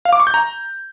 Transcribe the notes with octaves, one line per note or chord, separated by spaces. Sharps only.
F5
D6
C#6
G6
A#5